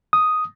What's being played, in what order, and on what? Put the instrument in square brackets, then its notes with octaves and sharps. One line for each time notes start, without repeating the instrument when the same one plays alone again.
[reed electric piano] D#6